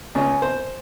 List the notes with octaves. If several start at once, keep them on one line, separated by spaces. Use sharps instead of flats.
C#2
C5